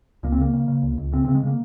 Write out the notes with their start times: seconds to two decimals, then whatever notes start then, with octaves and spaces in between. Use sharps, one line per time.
0.23 C#2 A#3
0.32 C4
0.38 C#3 A#3
0.53 C#3
0.68 C#3
0.83 C#2
0.98 C#2
1.12 C#3 C4
1.25 C4
1.28 C#3
1.35 G#3
1.43 C#3 A#3